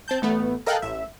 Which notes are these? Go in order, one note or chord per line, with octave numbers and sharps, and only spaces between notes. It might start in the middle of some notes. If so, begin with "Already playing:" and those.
C4 A5 G6
A1 A3 B3
A4 A#4 D#5 F5 G5 F#6
A1 E5